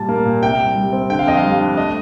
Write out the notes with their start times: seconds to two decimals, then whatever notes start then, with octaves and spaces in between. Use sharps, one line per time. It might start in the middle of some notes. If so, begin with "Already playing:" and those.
Already playing: A#2 G3 A5
0.09 A#3
0.25 A#2
0.42 C3 G5
0.60 C2
0.76 G3
0.93 C4
1.10 D3 G5
1.19 F5
1.27 F2 D#5
1.37 F5
1.43 G3
1.61 D4
1.77 A3 D#5